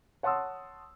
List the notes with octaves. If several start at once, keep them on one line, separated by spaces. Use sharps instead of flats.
C#5 F#5 A5 C6 D#6 E6